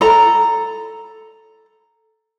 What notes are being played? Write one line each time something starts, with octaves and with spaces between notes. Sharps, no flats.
A4 A#5